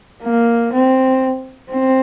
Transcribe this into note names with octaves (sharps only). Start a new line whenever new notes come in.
A#3
C4
C4